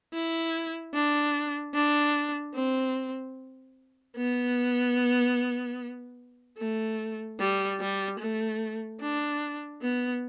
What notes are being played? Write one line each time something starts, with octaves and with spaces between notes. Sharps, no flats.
E4
D4
D4
C4
B3
A3
G3
G3
A3
D4
B3